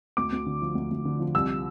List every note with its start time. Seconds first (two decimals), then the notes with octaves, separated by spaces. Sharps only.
0.17 D2 D6
0.33 D2
0.46 D3
0.62 F3
0.75 D2
0.91 D2
1.05 D3
1.19 F3
1.35 C2 E6